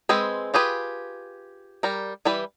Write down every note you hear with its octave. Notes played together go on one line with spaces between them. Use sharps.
G#3 C4 G#4 B4
F4 G4 G#4 B4
G3 A#4
E3 G3 B4